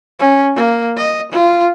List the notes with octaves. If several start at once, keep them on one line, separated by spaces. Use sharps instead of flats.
C#4
A#3
D#5
F4